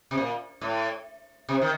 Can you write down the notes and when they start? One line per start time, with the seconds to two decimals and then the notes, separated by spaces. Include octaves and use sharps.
0.11 C3
0.18 A#2
0.61 A2
1.49 C3
1.61 D#3